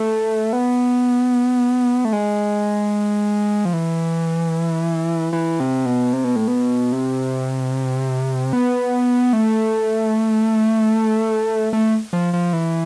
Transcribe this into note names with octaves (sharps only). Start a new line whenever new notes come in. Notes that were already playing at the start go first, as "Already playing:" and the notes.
Already playing: A3
B3
A3
G#3
F3
E3
E3
C3
B2
C3
B2
A2
B2
C3
B3
A3
A3
F3
F3
E3